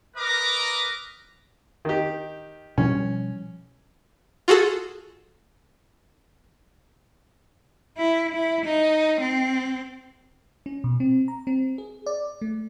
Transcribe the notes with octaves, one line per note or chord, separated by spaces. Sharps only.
A#4 B4 D#5 A#5 D6
D#3 G4
B2 F3 G3 C#4
F4 F#4 G#4 A4
E4
E4
D#4
C4
C#4
B2
C4
A#5
C4
G#4
D5
A3